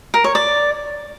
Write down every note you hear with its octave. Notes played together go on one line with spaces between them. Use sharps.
A#4
C#5
D5